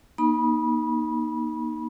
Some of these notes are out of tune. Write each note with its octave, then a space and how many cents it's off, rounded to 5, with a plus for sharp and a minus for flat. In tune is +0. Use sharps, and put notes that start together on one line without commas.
A#3 +35 D#4 +0 B5 -30